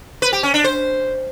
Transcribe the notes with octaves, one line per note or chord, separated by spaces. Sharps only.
B4
G4
C#4
D4
C5